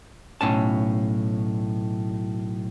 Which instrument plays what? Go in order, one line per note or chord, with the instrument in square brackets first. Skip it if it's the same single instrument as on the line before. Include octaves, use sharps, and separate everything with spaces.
[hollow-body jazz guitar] B1 A2 C#4 A5